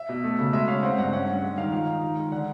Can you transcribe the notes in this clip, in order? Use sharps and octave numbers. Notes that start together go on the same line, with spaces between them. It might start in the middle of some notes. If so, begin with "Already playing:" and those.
Already playing: E5
B2
A3
C#3
G#3 E5
C#4 F5
C4 F#5
G2 F#5
C#4 F#5
C#4
G#3
D#3 F5
F3 F5
D#4
D#3
G#3
D3 F#5